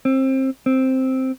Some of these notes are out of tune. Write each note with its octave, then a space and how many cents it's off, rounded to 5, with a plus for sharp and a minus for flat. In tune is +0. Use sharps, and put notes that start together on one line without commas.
C4 +25
C4 +0